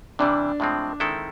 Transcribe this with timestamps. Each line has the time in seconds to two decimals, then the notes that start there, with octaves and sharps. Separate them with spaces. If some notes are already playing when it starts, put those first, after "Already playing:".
0.19 C3 E3 G3 D4
0.60 A2 F3 G#3 C4
1.00 D#3 G#3 C4 E4 A4